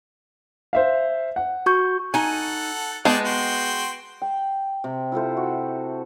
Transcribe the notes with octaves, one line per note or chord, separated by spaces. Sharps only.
C5 E5 F5
F#5
F#4 C#6 G6
D#4 A4 F#5 G#5
G#3 B3 D5 G5 A5
F#4 G5 C6
G5
C3
E4 F4 A4 C5
F#4